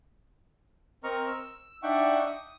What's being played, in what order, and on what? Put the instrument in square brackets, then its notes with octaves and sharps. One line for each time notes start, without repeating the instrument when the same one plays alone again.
[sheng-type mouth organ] C4 A#4 D#5 A#5 C#6 F6
E6
D4 D#4 E5 F#5 G5 C#6
D#6